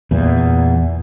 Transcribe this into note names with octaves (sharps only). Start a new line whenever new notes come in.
E2 A#2